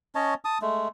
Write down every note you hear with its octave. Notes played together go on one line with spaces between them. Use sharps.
C#4 C#5 D#5 A5
A5 D#6
G#3 A3